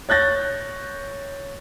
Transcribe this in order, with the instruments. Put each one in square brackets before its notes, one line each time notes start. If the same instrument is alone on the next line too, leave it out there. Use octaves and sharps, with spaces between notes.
[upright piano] C#5 F#6 G6 A6 A#6